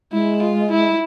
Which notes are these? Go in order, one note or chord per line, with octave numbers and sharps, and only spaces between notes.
G#3 E4
F4
E4